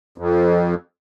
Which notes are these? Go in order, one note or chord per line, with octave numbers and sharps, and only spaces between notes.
F2